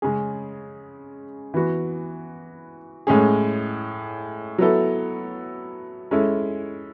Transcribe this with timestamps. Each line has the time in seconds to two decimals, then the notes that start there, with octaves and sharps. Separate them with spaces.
0.02 C#3 G#3 C#4 G#4
1.54 E3 B3 F#4
3.07 A2 G#3 C#4 G#4
4.58 F#3 B3 E4 A4
6.11 G#3 C#4 E4 A4